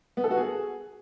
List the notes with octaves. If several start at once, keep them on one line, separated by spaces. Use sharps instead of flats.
B3
A4
F#4
G#4